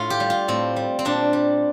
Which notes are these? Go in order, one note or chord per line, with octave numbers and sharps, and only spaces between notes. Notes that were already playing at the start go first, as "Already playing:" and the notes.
Already playing: A2 F4
G4
G3
F4
A2 C4
G3
C4
A#2 D4
G3